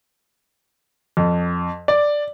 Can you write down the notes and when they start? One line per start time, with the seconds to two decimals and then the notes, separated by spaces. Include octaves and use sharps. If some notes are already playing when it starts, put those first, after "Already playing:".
1.17 F2
1.88 D5